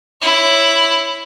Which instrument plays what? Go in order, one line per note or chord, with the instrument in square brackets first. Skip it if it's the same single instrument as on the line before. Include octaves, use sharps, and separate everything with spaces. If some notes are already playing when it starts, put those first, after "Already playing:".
[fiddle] E4 C#5